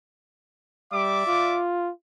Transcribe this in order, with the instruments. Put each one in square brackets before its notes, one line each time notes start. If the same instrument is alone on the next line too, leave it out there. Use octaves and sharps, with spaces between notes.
[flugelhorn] G3 [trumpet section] D5 E5 D6
[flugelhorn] F4